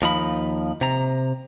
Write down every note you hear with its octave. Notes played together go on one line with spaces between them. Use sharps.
D#2 F3 D#4 B5
C3 A#5